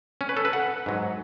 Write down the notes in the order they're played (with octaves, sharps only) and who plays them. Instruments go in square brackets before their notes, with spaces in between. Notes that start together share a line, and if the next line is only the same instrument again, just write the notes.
[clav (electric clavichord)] C#4
B4
A4
B4
F#5
G#2 F#3